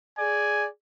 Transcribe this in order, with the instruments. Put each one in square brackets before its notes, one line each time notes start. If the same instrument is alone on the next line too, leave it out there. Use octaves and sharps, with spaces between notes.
[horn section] G#4 D5 G#5